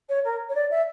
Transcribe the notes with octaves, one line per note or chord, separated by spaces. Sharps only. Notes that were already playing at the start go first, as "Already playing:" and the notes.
C#5
A#4
C#5
D5
E5